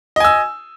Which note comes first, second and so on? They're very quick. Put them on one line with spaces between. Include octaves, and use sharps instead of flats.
D#5 G#5 E6